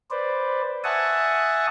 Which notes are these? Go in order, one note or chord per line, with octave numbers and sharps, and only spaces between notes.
B4 C5 D5
E5 F#5 G#5 A5 C#6 D#6